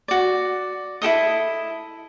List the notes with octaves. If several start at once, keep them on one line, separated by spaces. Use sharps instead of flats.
F#4 D5
E4 G4 A4 D#5